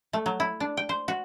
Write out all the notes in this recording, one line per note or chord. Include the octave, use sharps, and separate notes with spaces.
A3
F#3
E4
D4
G5
C5
F#4